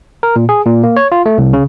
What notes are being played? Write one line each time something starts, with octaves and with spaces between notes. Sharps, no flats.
A#4
A#2
G#4
A#2
A#3
C#5
F4
A3
C2
C#3